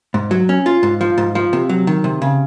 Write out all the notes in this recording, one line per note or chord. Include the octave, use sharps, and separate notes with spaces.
G#2
F#3
C#4
F4
G#2
F3
G#2
F3
C3
F#3
D#3
C3
C#3